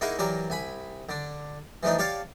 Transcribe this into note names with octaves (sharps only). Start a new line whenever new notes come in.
A#3 D#4 E4 F#4 G#4 A#4
E3 F#3 G4 A#4 D5
C2 G#5 B5
D3 D4
E3 F3 A3 D4 D#4
G4 C#5 D5 F5 A5